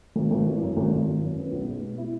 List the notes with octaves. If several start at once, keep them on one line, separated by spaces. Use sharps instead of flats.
G#1
G#1
E3
F#2
G#1
G#1
E3
F#2
B3
B1
G#3
B2
E4